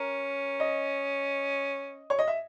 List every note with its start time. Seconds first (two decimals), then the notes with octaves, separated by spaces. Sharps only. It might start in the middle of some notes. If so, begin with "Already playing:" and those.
Already playing: C#4 A#4
0.60 D#5
2.10 C#5
2.19 D#5
2.28 E5